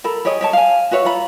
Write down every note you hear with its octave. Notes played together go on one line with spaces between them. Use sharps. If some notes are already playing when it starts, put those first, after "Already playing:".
A4 A#4 A#5 B5
G4 G#4 C#5 D#5
G4 C#5 A5
F5 G#5
F#4 B4 C#5 E5
F4 A#5 B5